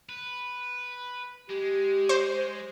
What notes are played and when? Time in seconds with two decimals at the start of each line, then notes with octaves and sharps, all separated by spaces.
0.09 B4
1.50 G#3 G4
2.09 C5